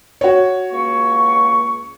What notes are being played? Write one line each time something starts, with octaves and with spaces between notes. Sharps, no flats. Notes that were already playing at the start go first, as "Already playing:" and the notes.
F#4 C#5
C#2 A#3 C#6